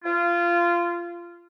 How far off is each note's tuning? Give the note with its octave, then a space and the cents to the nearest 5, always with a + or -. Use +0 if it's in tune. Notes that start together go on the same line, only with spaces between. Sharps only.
F4 -20